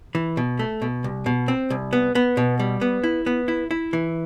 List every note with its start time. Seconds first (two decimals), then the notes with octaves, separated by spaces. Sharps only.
0.15 E3
0.37 B2
0.59 A3
0.82 B2
1.04 C2
1.26 B2
1.48 C4
1.70 C2
1.93 B3
2.15 B3
2.37 B2
2.60 G3
2.81 B3
3.03 E4
3.26 B3
3.48 E4
3.71 E4
3.93 E3